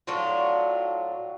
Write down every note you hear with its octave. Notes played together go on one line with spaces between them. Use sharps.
A2 F#3 D4 F4